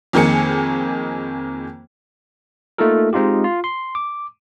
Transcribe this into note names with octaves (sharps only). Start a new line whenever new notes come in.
F2 D#3 A#3 G#4 C#7
A3 A#3 D#4 F4 A4 A#4
G#3 C4 D#4 F4 G4
F4
C6
D6